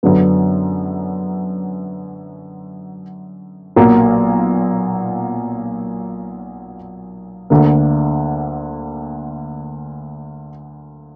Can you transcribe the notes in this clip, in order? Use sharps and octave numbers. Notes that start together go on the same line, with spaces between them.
F#2 D3 F#3 B3
B1 A#2 F#3 A#3
D2 D3 A#3